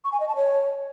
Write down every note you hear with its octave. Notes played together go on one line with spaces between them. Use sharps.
C#6
G#5
D#5
A5
C#5